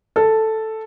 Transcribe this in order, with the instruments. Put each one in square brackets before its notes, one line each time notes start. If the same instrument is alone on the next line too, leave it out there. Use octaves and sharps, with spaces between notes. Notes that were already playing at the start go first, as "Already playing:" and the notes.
[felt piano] A4